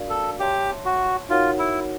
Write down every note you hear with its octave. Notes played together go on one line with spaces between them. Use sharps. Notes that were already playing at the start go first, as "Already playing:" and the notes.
Already playing: D4 F#4 A#4 D5 F5
A4
G4 C#5 E5 A5 C6
F#4
D#4 F4 F#4 A#4 C#5 F#5
E4